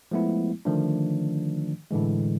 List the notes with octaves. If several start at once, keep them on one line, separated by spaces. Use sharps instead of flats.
F3 G#3 A3 B3 E4
D3 D#3 F3 A3 D4
A2 D3 E3 G#3